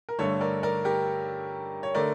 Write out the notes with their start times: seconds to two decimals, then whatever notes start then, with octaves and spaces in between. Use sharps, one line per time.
0.09 A#4
0.19 G2 D3 A3 A4 C#5
0.41 A#4 D5
0.63 A#4 D5
0.85 G4 A#4
1.83 C#5
1.95 D3 A3 A#4 D5